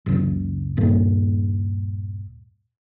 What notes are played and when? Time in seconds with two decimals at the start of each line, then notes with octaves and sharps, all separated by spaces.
0.06 F#1 C#2
0.77 D#1 G2 A#2